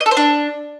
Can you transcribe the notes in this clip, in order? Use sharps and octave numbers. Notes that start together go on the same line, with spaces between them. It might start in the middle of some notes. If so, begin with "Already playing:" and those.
D#5
A4
C5
D4